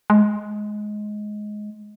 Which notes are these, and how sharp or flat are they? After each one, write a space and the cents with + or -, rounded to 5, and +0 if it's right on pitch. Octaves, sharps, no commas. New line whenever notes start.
G#3 +15